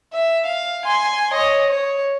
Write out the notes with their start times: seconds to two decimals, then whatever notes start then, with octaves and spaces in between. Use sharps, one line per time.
0.13 E5
0.46 F5
0.85 G#5 C6
1.33 C#5 D#5
1.68 C#5